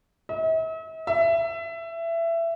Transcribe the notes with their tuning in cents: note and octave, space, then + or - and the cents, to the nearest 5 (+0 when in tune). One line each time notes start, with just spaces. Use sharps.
E5 -45
E5 +20